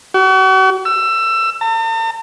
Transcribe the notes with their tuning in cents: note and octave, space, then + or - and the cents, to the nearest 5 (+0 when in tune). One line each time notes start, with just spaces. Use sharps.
F#4 +40
E6 +25
A5 +45